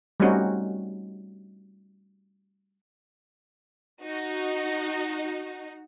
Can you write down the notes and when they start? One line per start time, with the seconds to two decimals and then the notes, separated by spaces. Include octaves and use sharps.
0.20 G3 A3 C4 C#4 D#4 F#4
4.03 D#4 F#4